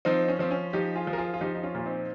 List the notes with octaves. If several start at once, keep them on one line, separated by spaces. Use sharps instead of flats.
F3 C4 D#4
C#4
F3 C4
C#4
F3 D#4 G4
F4 G#4
F3
A#4
F4 G#4
F4
F3 D#4 G4
D#4
C#4 F4
A#2 F4
C4 D#4